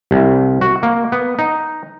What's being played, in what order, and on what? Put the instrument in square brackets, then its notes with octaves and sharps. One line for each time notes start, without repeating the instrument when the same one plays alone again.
[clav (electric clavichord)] C2
F#4
A#3
B3
D#4